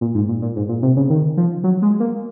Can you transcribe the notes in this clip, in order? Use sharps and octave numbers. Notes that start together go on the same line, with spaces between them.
A#2
G#2
A#2
A#2
G#2
A#2
C3
C#3
D#3
F3
F#3
G#3
A#3